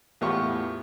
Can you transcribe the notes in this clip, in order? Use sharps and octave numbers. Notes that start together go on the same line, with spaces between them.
E2 A2 B3 F4 G4 C#6